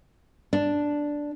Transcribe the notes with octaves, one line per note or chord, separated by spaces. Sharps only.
D4